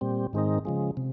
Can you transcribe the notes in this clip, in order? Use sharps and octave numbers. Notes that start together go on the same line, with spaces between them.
A#2 G3 C4
G#2 D#3 G#3 C4 D#4
C#3 F3 G#3
C3